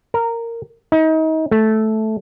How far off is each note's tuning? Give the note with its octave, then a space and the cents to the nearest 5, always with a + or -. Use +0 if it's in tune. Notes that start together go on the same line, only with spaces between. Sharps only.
A#4 -10
D#4 +30
A3 -10